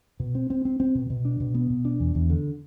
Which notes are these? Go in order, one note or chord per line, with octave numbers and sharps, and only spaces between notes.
B2
C4
C4
C4
C4
B2
B2
D4
B2
B3
B2
D4
E2
E2
D3